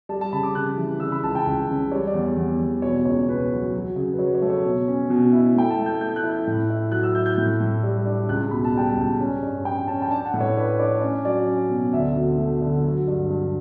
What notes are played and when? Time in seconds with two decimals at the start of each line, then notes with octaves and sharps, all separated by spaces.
0.09 G3 A5
0.21 A5
0.33 C#3 B5
0.43 D6
0.55 C#3 F#6
0.78 E3
1.00 C#3 E6
1.12 B5
1.24 C#2 A5
1.35 G5
1.46 C#2
1.69 C#3
1.92 G3 C#5
2.07 D5
2.14 E2
2.37 E2
2.59 E2
2.82 B2 C#5
3.05 C#2 C#5
3.29 B2 B4
3.51 F#3
3.74 F#3
3.96 C#3
4.13 B4
4.19 F#3 C#5
4.35 C#5
4.42 A3
4.50 C#5
4.65 B2
4.88 C#4
5.10 B2
5.33 E4
5.55 A3 G5
5.70 A5
5.79 A3
5.86 G6
6.01 A3 G6
6.16 F#6
6.23 E4
6.31 G6
6.47 A2
6.70 E4
6.92 F#3 F#6
7.03 E6
7.15 E4 G6
7.26 G6
7.38 A2
7.60 A2
7.83 G3
8.05 D4
8.29 C#2 F#6
8.51 B2 B5
8.65 A5
8.75 G3 G5
8.90 A5
8.96 C#2
9.20 C#4
9.42 G2
9.65 C#4 G5
9.88 C#4 A5
10.02 G5
10.11 D4 A5
10.26 F#5
10.34 A2
10.41 C#5
10.57 D4 B4
10.79 D4 C#5
11.01 C#4 D5
11.25 F#3 D5
11.47 C#4
11.70 B2
11.92 D2 E5
12.16 D2
12.38 A3
12.62 D3
12.83 F#3
13.07 G2
13.30 G2